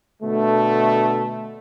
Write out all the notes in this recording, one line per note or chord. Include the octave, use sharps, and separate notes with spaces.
B2 D3 A3